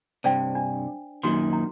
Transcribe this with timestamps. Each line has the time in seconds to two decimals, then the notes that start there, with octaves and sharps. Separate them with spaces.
0.24 G2 C3 C5 D5 G5
0.55 D4
1.23 F#2 A#2 D#3 F#4 C6
1.53 A#5